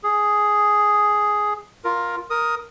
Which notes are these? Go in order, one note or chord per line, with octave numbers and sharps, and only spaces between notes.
G#4
F4 A#4
A#4 D#6